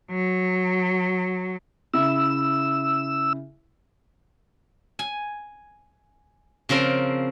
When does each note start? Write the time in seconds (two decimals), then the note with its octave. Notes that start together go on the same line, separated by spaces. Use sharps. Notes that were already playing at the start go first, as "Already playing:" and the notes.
0.11 F#3
1.94 C#3 E4 E5 E6
4.99 G#5
6.69 C#3 F3 C4 A#4